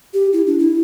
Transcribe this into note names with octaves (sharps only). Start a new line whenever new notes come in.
G4
E4
D4
E4